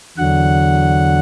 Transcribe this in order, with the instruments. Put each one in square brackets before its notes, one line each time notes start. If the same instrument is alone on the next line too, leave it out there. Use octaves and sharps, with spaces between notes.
[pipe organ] E2 D3 F#3 F#5